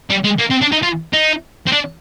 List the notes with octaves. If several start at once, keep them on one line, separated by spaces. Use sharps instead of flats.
G3
G#3
A#3
C4
D4
D#4
F4
D#4
C4
D4